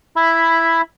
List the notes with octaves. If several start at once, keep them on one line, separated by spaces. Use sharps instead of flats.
E4 E5 B5